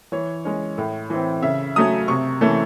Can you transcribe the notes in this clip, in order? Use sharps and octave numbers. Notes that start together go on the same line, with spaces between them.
E3 C#5
G#3 C#4
A2
E3 C4
C#3 E5
F#3 A3 C#4 D#6
C3 C#6
E3 A3 C#4